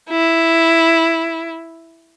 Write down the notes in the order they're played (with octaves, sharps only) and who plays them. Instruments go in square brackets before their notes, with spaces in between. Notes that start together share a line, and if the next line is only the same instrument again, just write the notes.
[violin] E4